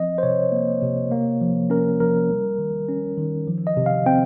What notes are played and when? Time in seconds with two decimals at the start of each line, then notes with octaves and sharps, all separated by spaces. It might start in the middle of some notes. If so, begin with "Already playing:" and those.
Already playing: F3 C4 D#5
0.18 C5
0.23 C3 C#5
0.52 A#3
0.82 C3
1.11 A#3
1.42 F3
1.70 C#4 A#4
2.00 F3 A#4
2.30 G3
2.59 D#3
2.88 C#4
3.17 D#3
3.47 F3
3.67 D#5
3.77 C3
3.86 F5
4.06 C4 G5